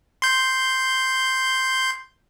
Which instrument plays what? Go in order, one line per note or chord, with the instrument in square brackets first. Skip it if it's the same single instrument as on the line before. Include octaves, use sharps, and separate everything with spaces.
[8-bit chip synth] C6 G6